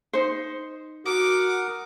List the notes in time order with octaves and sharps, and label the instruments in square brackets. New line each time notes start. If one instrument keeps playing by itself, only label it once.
[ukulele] D#4 C5
[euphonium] F#4 [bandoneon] A#4 F#5 D#6 [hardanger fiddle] D6